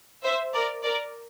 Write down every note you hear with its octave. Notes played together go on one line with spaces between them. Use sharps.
C5 E5
A#4 D5
A#4 D5